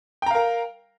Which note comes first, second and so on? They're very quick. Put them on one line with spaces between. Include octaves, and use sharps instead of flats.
G5 A#5 F5 A#4